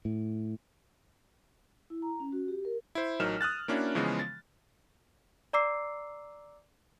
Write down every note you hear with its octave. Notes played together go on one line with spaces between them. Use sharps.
A2
E4
A#5
C#4
F#4
G4
A#4
E4 C5
A1 F#3 D#4 A#4 F6 E7
D#6 F6 F#6 A6
A#3 C#4 D4 E4 F#4
C#3 E3 F3 G#3 B3
A6
D5 A#5 D6 E6 C7